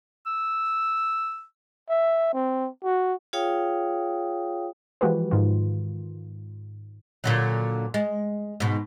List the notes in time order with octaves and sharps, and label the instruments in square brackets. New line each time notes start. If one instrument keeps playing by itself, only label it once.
[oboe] E6
[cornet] E5
C4
F#4
[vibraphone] F4 G#4 C#5 F5 G5 D#6
[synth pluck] E3 F3 G#3 F#4 G4 B4
G#2 D#3 F4
[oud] A#2 D3 F#3
G#3
G#2 B2